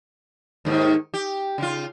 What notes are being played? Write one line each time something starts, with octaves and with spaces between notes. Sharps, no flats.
D#2 G#2 D#3
G4
C#3 F4